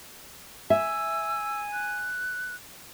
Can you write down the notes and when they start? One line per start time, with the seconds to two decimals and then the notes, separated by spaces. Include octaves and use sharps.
0.70 E5 G#5 E6
1.73 F#6